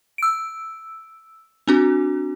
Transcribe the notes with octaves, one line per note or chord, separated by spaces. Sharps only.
E6 D7
C4 D4 F#4